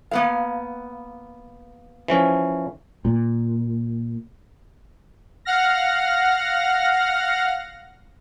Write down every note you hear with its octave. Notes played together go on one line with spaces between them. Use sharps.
A#3 B3 F5
E3 F3 C#4
A#2
F5 F#5 F6 A#6